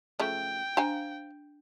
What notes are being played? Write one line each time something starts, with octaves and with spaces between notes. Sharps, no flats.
C#3 F3 A3 G5
D4 C5 F5 G#5